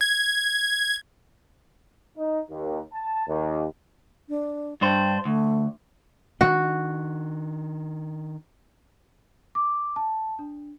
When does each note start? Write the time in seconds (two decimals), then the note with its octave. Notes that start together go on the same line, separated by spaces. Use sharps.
0.01 G#6
2.17 D#4
2.50 D#2
2.93 A5
3.27 D#2
4.29 D4
4.81 G2 D4 C5 G5
5.25 D2 A3
6.41 D#3 D4 F#4
9.55 D6
9.96 A5
10.39 D4